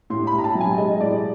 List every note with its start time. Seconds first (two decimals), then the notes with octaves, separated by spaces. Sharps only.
0.10 A2 C6
0.27 B5
0.32 A2
0.38 A#5
0.44 A5
0.55 F#3
0.61 G#5
0.77 G#3 D#5
1.00 A2 D5